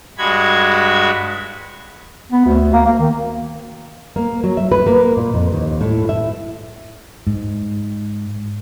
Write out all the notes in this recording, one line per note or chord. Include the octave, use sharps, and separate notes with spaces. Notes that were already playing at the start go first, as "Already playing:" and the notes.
G2 G#3 F#4 B5 G#6
B3
D2
A#3
A#3
D#3
A#3
F#3
E5
B4
A#3
A#2
F2
D#2
A2
E5
G#2